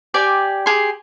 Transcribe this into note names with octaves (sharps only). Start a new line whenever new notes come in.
G4 D5 G5 G#5
G4 G#4 C6